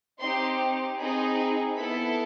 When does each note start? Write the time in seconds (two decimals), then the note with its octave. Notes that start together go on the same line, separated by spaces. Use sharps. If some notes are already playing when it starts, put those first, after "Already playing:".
0.20 C4 D#4 G4 C6
0.98 C4 D#4 G#4 B5
1.77 B3 E4 A4 B5